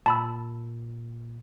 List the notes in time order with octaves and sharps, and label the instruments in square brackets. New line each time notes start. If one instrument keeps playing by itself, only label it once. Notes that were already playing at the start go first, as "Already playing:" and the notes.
[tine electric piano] A#2 [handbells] A5 B5 E6